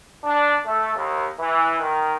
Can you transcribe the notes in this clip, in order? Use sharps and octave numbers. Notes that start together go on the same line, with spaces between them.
D4
A3
D#2
E3
D#3